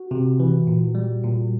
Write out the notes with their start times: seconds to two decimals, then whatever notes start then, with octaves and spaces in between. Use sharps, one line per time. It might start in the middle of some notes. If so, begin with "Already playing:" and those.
Already playing: F#4
0.11 C3
0.40 E3
0.67 A#2
0.95 G3
1.24 A#2